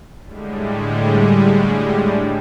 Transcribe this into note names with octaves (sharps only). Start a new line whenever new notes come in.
A2 D3 G3 G#3